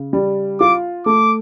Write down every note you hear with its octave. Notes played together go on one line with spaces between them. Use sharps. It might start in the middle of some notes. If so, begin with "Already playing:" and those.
Already playing: C#3
G3
F4 D6
A3 D6